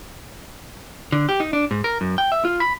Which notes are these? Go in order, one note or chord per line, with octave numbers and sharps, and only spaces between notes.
D3
G4
D#4
D4
G#2
A#4
F#2
G5
E5
F4
B5